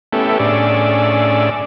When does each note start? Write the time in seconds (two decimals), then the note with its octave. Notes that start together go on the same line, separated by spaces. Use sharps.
0.13 A3 B3 C#4 E4 G4 A4
0.40 A2 C#4 D4 G#4 D5 E6